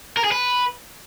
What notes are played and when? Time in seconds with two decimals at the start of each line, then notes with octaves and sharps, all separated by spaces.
0.17 A#4
0.24 G#4
0.32 B4